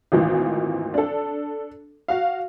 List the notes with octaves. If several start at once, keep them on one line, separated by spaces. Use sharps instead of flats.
G#1 D2 A#2 D#3 E3
D4 A4
F#4 F5